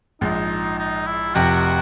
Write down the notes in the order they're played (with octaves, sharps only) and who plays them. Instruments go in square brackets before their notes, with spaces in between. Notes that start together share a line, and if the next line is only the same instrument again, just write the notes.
[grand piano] A#1 G#2 F3 G#3 [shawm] D#4
[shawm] D#4
E4
[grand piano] F1 F2 C3 [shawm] F#4